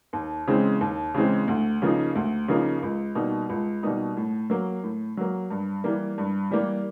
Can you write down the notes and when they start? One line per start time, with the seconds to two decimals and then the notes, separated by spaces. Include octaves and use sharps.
0.13 D#2
0.48 C#3 E3 G#3 C4
0.81 D#2
1.14 C#3 E3 G#3 C4
1.48 D2
1.82 C#3 F3 A#3 D#4
2.16 D2
2.48 C#3 F3 A#3 D#4
2.82 C#2
3.15 B2 G3 A#3 D#4
3.49 C#2
3.83 B2 G3 A#3 D#4
4.17 A2
4.50 F#3 A#3
4.83 A2
5.17 F#3 A#3
5.50 G2
5.84 E3 G3 A#3
6.18 G2
6.51 E3 G3 A#3